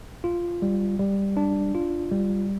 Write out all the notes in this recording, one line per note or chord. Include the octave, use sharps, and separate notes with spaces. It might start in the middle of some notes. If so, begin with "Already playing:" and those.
F4
G3
G3
D4
F4
G3